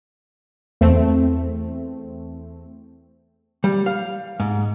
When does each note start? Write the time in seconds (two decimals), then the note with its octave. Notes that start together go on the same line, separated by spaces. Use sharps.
0.81 E2 A3 C4
3.64 G3
3.86 F5
4.40 G#2